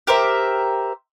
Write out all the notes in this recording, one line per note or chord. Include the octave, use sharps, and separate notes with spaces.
G4 A#4 C5 E5